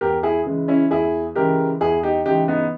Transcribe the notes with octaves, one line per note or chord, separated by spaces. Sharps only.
E2 G4 A#4
E4 G#4
C#3 E3 G#3
C#4 E4
E2 E4 G#4
C#3 E3 G#3 G4 A#4
E2 E4 G#4
D#4 G4
C#3 E3 G#3 D#4 G4
B3 D#4